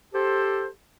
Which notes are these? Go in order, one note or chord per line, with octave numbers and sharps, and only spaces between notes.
G4 A4 C5